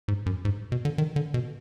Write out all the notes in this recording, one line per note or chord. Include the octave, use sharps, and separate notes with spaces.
G#2
F#2
G#2
B2
D3
D#3
D3
B2